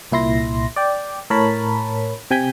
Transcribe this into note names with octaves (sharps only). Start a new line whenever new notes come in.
C2 A#2 E4 C6 A#6
D5 G5
A2 A#4 C#5 A5 B5
C3 G5 G#5 G6 B6